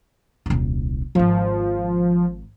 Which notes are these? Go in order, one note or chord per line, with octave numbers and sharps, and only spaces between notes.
D#1 C2
D#1 G#1 F3